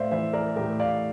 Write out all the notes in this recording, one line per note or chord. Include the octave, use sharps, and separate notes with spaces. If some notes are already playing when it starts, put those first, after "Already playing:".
Already playing: A2 C5 D5 E5 F5
E3 C5 E5
A#4 D5
A2 G4 A#4
D5 F5